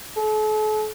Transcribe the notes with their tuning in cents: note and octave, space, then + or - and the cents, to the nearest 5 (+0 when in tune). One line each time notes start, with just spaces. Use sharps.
A4 -40